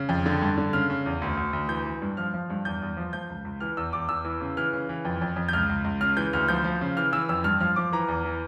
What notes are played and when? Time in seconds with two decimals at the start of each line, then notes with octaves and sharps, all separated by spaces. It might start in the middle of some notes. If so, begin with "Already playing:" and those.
Already playing: C#3
0.09 F2
0.26 D3
0.42 G2
0.58 D3
0.73 C#3 F6
0.90 C#3
1.06 E2
1.22 D2
1.37 D2
1.53 D2
1.69 E3 G6
1.85 E3
2.02 G2
2.17 F3 F6
2.34 F3
2.50 G2
2.65 E2 G6
2.82 E2
2.97 F3
3.13 F3 G6
3.30 C#2
3.45 C#2
3.60 E3 F6
3.77 E2 E6
3.93 E2 D6
4.09 E2 E6
4.25 E3
4.41 C#3
4.57 E3 F6
4.73 C#3
4.89 E3
5.05 F2
5.21 F2
5.36 F2
5.49 G6
5.53 C#2 F6
5.69 C#2
5.84 C#2
6.01 C#3 F6
6.17 E3 G6
6.33 D2 F6
6.48 F3 G6
6.64 F3
6.81 C#3
6.97 E3 F6
7.12 E3 E6
7.29 F2 E6
7.44 G2 F6
7.61 F3 F6
7.76 F3 D6
7.92 E3 A#5
8.08 E2
8.25 E3